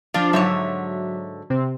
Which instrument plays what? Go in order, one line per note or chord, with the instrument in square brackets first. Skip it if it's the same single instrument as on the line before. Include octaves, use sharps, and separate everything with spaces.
[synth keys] F3 F4 [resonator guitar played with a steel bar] D4
[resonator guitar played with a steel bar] G#2 D3 C#5 [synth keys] F#3 E5
[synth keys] C3 C4